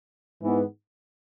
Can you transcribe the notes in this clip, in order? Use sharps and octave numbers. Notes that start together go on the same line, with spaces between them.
G#2 E3 B3